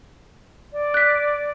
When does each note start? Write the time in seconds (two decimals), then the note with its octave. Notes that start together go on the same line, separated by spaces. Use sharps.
0.73 D5
0.94 F#6 B6